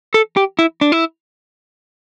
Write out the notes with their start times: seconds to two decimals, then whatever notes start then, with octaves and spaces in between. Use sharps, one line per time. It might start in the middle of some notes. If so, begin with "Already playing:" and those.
0.14 A4
0.37 G4
0.59 E4
0.81 D4
0.92 E4